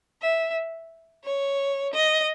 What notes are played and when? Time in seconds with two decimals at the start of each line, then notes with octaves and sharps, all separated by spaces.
0.20 E5
1.23 C#5
1.91 D#5